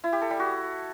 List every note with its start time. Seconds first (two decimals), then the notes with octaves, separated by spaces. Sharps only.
0.04 E4
0.13 G4
0.22 A4
0.31 G3
0.40 F#4